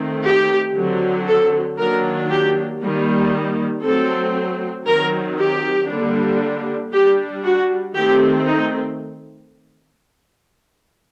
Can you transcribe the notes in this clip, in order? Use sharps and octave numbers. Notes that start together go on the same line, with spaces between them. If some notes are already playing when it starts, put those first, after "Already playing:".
Already playing: D#3 A3 C4
G4
D3 F#3 C4
A4
D#3 F#3 A#3 D4 A#4
G4
D#3 G3 A#3
F#3 A3 C4 A4
D#3 F#3 C4 A#4
G4
D3 G3 A#3 D4
G3 D4 G4
F#4
D#3 A3 C4 G4
D#4